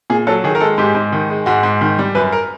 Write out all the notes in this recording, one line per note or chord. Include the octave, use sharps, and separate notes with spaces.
A#2 G#4
F#3 A4
D#3 G#4
A#4
G#3 A4
G#2 G4
G#2
D#3
G#3
G#2 F#4
G#2
D#3
G3
F#2 B4
A#4